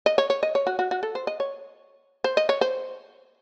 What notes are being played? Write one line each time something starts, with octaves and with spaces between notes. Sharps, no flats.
D#5
C#5
C#5
D#5
C#5
F#4
F#4
F#4
A4
C5
D#5
C#5
C5
D#5
C#5
C5